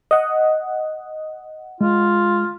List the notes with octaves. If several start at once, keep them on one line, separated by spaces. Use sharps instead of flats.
D#5 F#5
G#3 F4